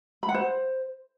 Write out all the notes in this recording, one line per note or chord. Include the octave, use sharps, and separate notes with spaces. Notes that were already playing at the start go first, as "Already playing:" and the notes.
B5
F#5
C5